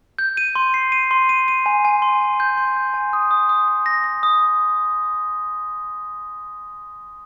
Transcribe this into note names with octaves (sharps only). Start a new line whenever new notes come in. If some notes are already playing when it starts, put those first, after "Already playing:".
G6
D#7
C6
C7
D#7
C6
D#7
D#7
G#5
G#5
C6
G#5
G6
C6
G6
G#5
D#6
D#6
D#6
D#6
A#6
A#6
D#6